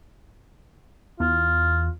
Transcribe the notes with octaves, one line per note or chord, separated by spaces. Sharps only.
E2 F4